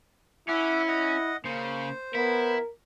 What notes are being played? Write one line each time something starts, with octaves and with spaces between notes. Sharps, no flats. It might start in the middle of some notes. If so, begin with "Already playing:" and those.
C#4 E4 E5 F#5 D6
D#5 F#5
C#3 A#3 C5
B3 E4 A#4